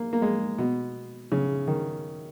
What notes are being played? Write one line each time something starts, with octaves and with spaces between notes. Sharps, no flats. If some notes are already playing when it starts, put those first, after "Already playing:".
Already playing: A#3
A#3
G#3
B2
C#3
D#3